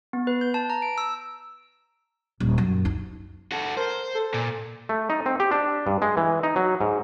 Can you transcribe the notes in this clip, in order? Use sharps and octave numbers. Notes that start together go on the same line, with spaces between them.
B3
B4
G6
A5
A#5
D7
E6
D#1
F#2
D#4
F#4 A4
A#4 C5
A4
A#2
A3
D#4
C4
G4
D4
G2
G#3
E3
D#4
F#3
G#2